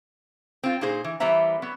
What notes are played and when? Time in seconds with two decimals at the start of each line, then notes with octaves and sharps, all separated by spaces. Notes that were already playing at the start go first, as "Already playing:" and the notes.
0.63 C4 F4
0.81 A#2 D#4 G#4 C5
1.04 E3
1.20 E3 G3 B3 C5 E5 A#5
1.62 F#3 B3